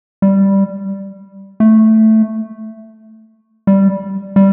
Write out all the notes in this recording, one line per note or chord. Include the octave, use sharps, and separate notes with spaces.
G3
A3
G3
G3